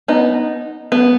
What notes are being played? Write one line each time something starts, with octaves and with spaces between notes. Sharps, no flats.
B3 D#4
B3